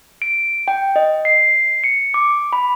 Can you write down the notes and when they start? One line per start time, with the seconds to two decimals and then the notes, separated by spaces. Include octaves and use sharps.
0.22 D7
0.68 G5
0.96 D#5
1.25 C7
1.84 C#7
2.14 D6
2.53 B5